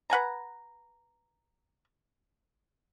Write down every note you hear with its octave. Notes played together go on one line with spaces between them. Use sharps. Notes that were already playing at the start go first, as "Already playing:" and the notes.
B4 F#5 G#5 A#5